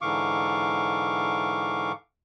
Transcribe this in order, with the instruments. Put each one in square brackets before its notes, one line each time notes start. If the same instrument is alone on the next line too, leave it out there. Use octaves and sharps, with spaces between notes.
[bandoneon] G#2 D3 E3 F5 C#6 D6